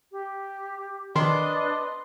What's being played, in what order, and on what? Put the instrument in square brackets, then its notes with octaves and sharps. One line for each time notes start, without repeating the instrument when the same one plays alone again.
[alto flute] G4
[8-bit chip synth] D#3 [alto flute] D4 [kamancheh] B4 D#5 [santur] C6